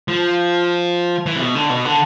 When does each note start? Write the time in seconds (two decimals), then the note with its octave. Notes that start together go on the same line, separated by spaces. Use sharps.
0.08 F3
1.26 E3
1.36 C3
1.41 B2
1.55 D3
1.70 B2
1.85 D3